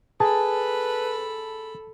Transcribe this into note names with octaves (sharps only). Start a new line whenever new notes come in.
G#4 A4 B4 A5 B5